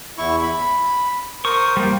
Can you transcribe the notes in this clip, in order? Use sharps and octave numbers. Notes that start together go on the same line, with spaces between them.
E2 E4 C#6
B5
A#4 C5 C#6 D#6
G3 A#3 C5